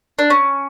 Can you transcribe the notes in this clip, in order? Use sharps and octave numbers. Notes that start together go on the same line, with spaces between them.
D4
C#4